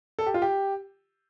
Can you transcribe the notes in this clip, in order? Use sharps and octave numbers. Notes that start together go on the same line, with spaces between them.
A4
G4
F4
G4